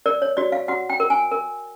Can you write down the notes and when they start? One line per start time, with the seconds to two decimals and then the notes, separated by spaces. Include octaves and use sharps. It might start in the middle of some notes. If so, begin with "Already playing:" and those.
0.06 A#4 D5
0.22 C#5
0.37 F#4 D5
0.52 F5
0.68 F#4 F#5
0.90 G5
1.00 A#4
1.10 G#5
1.32 A#4